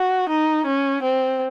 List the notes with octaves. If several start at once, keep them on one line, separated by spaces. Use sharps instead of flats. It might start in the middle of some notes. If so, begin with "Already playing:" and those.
Already playing: F#4
D#4
C#4
C4